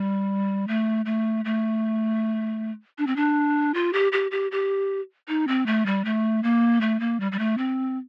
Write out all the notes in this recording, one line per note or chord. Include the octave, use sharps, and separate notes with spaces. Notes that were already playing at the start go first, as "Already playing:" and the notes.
Already playing: G3
A3
A3
A3
D4
C4
D4
F4
G4
G4
G4
G4
D#4
C4
A3
G3
A3
A#3
A3
A#3
G3
G3
A3
C4